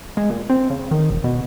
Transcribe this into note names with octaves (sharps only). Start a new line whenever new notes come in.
G#3
A#2
C4
C#3
D#3
E1
B2